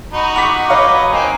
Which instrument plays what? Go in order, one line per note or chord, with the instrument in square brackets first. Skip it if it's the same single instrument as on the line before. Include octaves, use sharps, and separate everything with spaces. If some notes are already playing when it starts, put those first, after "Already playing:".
[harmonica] D#4 F#4 [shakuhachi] B5
[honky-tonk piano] F#5 D6 B6 [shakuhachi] C#6
[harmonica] F#3 B4 D#5 [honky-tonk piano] C#5 F5 [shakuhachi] D6
[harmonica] A#3 C4 D#4 [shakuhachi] G#5